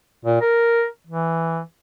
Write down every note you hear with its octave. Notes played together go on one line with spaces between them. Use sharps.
A#2
A#4
E3